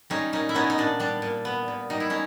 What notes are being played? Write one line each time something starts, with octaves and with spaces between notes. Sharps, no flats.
G3 C#4 D#4
A#2 C#4 D#4
E4
B3 C#4 D#4
D#4
A#2 D4
G3 D4
A#2
B3
A#2
G3 D#4
E4
C#4 D#4